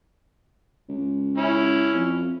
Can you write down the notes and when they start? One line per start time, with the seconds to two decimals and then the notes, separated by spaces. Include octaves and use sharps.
0.89 C#2
1.38 C#4 E4
1.93 F2